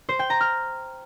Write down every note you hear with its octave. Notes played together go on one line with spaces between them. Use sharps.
C5
G5
A#5
F6